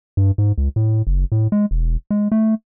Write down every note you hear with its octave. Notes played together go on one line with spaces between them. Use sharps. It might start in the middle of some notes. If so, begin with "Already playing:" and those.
G2
G#2
C#2
A2
F#1
A2
G#3
E1
G#3
A3